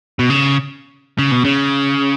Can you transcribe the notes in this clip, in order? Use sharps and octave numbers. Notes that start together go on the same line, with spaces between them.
B2
C#3
C#3
B2
C#3